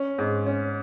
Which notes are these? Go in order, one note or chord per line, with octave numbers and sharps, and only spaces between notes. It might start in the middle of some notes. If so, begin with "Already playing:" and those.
Already playing: C#4
G#2
C#4